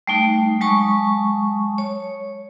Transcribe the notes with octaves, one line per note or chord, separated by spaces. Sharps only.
G3 A3 D#4
F#3 G#3 A5 C#6 D#6
C#5